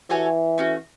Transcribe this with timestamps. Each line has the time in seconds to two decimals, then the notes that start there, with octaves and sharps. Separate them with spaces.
0.10 E3 F#4 A4 C#5 G#5
0.58 A3 C#4 F#4